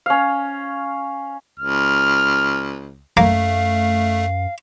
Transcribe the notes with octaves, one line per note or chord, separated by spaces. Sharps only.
C#4 F5
C#2 F6
F#2 A3 A#3 F5